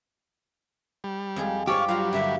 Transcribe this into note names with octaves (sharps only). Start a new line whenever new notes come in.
G3
F2 G#3 G#4
G2 F3 G3 G4 F5 C#6
F#3 G3 F4 F5 A#5
G2 D3 A#3 E5